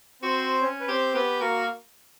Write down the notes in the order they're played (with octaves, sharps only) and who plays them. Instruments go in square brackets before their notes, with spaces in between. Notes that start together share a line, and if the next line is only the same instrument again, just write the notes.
[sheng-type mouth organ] C4 C5 [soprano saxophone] F#4
[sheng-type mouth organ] C#4 C#5
B4
[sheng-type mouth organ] C4 C5 [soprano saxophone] G4
[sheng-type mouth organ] B3 B4 [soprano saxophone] G4
[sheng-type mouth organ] A#3 A#4 [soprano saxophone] F#4